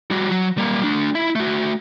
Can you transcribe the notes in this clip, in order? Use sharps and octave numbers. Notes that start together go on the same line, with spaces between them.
G3 F#4
F#3
G3 A#3
A3 D4
E4 E5
A3 F#4